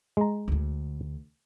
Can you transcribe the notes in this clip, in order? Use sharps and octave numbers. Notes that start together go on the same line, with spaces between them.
G#3 A#5
D2 D3